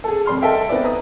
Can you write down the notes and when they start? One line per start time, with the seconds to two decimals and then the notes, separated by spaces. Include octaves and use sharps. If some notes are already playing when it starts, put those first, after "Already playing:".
0.04 G#4 A4
0.26 F1 G3 C6 F6
0.42 A4 D#5 E5 G5
0.68 B3 D#4 B4 C5 D5 E5
0.84 A#5 D#6